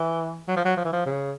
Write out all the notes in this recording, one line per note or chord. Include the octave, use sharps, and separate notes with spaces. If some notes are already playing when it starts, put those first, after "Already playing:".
Already playing: E3
F#3
F3
F#3
F3
E3
F3
C#3